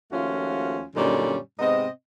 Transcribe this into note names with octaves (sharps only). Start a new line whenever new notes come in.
D#2 F3 A3 C#4 F4 F#4
F#2 A#2 D3 G3 C#4 D#4
G#2 C3 B3 C4 D#5